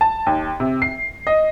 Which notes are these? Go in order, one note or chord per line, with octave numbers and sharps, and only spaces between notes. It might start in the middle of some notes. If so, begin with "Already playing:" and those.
A5
D#2
C3
C7
D#5